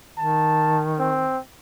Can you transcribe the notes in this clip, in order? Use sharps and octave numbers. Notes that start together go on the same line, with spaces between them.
D#3 A5
C4